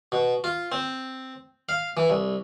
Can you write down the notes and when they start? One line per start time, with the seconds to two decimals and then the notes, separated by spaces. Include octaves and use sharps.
0.12 B2
0.44 F4
0.72 C4
1.69 F5
1.97 E3
2.10 C2